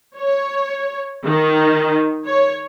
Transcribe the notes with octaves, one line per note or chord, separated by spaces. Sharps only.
C#5
D#3
C#5